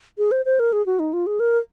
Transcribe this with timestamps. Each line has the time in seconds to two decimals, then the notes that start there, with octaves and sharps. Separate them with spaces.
0.18 G#4
0.31 C5
0.45 C5
0.59 A#4
0.72 G#4
0.86 F#4
0.99 D#4
1.13 F4
1.26 G#4
1.40 A#4